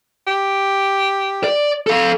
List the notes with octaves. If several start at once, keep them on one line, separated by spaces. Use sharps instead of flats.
G4
D5
A4 F5